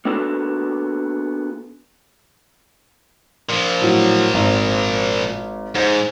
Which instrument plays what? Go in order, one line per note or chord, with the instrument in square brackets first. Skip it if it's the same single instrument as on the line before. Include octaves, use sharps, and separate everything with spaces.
[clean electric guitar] A#3 B3 D4 F#4 A4
[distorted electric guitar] A#2 F3
[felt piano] A2 F#3
G#1
[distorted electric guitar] G#2 [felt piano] C5 G6